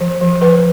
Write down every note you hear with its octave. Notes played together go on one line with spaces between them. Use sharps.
F3
F3
F3 B4